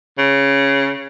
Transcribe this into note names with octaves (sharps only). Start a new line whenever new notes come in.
C#3